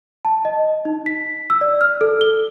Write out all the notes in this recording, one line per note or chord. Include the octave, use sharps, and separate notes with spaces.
A5
D#5
D#4
B6
E6
D5
F6
A4
G7